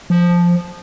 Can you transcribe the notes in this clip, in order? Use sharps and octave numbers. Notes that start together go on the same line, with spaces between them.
F3